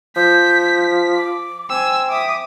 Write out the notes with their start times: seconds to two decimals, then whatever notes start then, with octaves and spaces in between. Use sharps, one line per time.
0.16 F3 G6 B6
1.15 D6
1.70 C4 G#5 E6
2.10 E5 D6 D#6